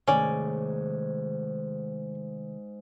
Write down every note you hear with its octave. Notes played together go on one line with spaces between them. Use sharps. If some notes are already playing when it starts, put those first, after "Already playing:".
G#2 C3 D#3 A3 C#4 D5